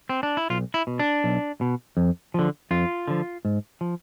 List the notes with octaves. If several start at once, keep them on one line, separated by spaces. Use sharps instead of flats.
C4
D4
E4
B1 F4
E4
B2
D4
B1
B2
F2
D3 F3
F2 F4
D3 F3
G#2
F3